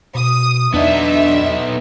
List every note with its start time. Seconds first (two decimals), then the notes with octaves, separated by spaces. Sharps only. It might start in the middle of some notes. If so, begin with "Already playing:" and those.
0.15 B2 D#6
0.74 E2 B3 D4 D#4 E5